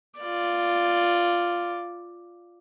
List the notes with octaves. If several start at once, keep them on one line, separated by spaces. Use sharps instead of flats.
F4 D5